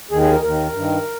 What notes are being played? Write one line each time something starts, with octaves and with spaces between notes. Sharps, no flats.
D#2 D#3 G#4
G#4
A#4
D#2 D#3 A#4
G2 D#3